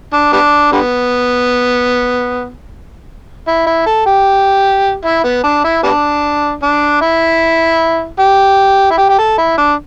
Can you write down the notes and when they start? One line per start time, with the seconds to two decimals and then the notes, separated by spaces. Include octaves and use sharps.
0.13 D4
0.33 G3 B3 D4
0.72 D3 G3 B3
3.47 E4
3.67 E4
3.86 A4
4.06 G4
5.05 E4
5.24 B3
5.44 D4
5.64 E4
5.83 G3 B3 D4
6.63 D4
7.02 E4
8.19 G4
8.91 E4
8.98 G4
9.09 G4
9.18 A4
9.38 E4
9.58 D4